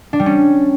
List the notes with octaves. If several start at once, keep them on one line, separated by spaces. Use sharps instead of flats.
D4
G3
C#4